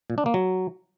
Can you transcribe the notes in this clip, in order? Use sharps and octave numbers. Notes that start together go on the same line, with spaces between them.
A#2
D4
A#3
F#3